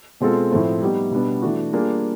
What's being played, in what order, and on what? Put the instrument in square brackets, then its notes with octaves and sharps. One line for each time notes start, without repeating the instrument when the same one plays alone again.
[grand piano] B2 G#3 C4 F4 A4
A2 F3 A3 C4
G3 B3 D#4 G4
B2 G3 B3 D4
E3 A3 D4 F#4
G3 A#3 D4 F4 G#4